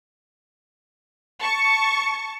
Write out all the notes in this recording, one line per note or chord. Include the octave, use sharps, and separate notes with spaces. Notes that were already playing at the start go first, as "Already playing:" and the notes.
A5 C#6